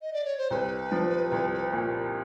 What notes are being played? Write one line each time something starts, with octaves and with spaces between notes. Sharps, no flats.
D#5
D5
C#5
C5
C2 B4 C5
F3
C2
A#2